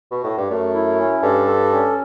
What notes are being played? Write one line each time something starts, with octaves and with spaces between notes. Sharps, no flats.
B2
A2
G2
F#2 A3
E4
C#4
G2 A4
A4
C#4